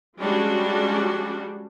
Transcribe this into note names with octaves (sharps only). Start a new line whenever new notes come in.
F3 G3 G#3 C#4 D4 F#4